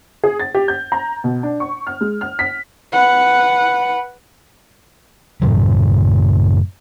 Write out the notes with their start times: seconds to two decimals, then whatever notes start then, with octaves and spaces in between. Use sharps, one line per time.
0.24 G#4
0.40 A6
0.55 G4
0.68 G6
0.92 A#5
1.24 B2
1.43 D4
1.60 C#6
1.87 F6
2.01 G#3
2.21 F6
2.39 B6
2.93 B4 F#5
5.42 F#2 A2 C#3 F#3